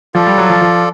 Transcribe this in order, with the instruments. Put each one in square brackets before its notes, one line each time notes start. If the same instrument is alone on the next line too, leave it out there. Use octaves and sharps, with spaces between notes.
[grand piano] F3 [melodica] F4 A4 D5
[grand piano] G3
F#3
F3
F3